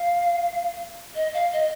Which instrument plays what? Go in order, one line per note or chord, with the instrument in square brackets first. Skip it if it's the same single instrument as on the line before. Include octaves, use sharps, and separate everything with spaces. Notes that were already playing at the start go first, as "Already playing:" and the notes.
Already playing: [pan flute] F5
D#5
F5
D#5